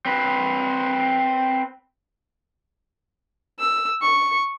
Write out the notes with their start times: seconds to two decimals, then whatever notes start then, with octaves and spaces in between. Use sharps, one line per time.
0.06 C4 B4
3.60 E6
4.02 C#6